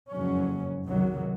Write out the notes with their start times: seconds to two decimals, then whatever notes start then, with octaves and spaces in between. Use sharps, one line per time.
0.10 F#1 F2 G#2 F#3 C#4
0.86 C#2 C3 D#3 F#3